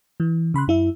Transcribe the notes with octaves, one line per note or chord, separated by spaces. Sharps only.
E3
C#3 B5 C6 F#6
F#2 E4 E5